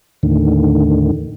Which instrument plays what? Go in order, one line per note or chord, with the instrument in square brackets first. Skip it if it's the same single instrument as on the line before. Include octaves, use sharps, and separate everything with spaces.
[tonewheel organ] D#2 A2 D3 D#3